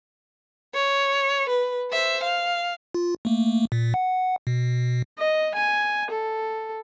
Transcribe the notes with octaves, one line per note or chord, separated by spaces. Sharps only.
C#5
B4
C5 E5
F5
F4
A3 A#3
A#2
F#5
B2
D#5
G#5
A4